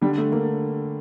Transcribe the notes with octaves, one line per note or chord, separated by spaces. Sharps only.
D3 G3
A3
D3 A#3